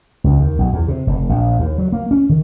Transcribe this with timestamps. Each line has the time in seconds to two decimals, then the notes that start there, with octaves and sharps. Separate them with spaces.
0.24 C#2
0.39 D#2
0.59 B1
0.73 E2
0.88 C3
1.07 F1
1.29 A#1
1.59 D#2
1.78 F#3
1.92 A#3
2.11 C#4
2.29 D#3